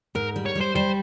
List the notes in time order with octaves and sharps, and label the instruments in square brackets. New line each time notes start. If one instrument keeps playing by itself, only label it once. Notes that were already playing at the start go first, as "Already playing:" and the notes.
[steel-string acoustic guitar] G#2 [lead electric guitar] A#4
[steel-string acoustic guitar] G3
[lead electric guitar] C#5
[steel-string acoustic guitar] G3
[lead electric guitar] C5
[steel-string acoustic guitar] G3 [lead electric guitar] C5